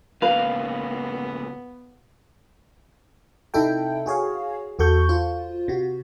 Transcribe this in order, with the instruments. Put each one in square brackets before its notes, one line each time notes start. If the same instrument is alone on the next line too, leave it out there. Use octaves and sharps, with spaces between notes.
[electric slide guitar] G#2 C#3 A#3 [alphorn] B3 [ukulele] B4 [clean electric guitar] F5
[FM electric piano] C3 D#4 E4 A4 G5
F#4 G#4 C#5 F5
E2 F#4 A4 C#6 G6
F4 C5
C3 F#4